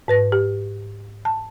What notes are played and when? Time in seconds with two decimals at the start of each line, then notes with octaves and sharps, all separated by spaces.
0.08 G#2 B4 A#6
0.32 G4
1.25 A5